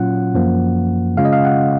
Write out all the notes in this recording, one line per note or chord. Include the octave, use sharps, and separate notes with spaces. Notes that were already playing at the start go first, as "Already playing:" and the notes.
Already playing: A#2 F#3 C#4 F4 F#5
F#2 F3 A#3
C#3 G#3 C#4 F4 F5
D#5
F5
F#5